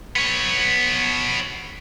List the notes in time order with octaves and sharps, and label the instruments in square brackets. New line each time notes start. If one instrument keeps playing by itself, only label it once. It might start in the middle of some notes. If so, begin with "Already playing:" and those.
[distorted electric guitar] B3 C#5